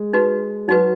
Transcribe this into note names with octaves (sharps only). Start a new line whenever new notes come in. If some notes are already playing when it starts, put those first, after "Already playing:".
Already playing: G#3
D#4 F#4 B4
F#3 D#4 F#4 B4